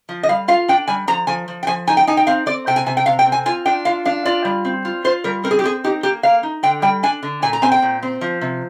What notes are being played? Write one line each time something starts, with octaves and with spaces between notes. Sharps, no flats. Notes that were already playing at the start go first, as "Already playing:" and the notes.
F3
D#5
G3 F5
F4 F5
D4 G5
G3 G#5
F3 A#5
F3 G#5
F3
G5
F3 G#5
D#4 G#5
G5
D#4 G#5
G5
C4 F5
C4 D5
C3 G5
G#5
C3 G#5
G5
C3 F5
G5
C4
G#5
F4 G#5
D4 G5
F4 F5
D4 F5
F4 D5
G3
C4
F4
F4 C5
G3 A#4
C4 A#4
G#4
G4
C4 G#4
D#4 G4
A#3 G4
A#3 F5
D#4
D3 G5
G3 G5
D4 G#5
D3
A#2 G#5
A#5
C4 G#5
G5
A#2
C4
F3
C3